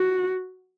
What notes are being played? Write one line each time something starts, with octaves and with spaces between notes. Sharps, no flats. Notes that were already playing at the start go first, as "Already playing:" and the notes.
Already playing: F#4